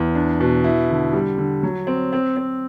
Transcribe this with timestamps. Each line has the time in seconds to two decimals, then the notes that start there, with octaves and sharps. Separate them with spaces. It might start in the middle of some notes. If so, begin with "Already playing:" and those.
Already playing: E2
0.15 D4
0.40 B2
0.64 E4
0.90 D3
1.13 G3
1.38 D3
1.63 F#3
1.87 C4
2.13 C4
2.36 C4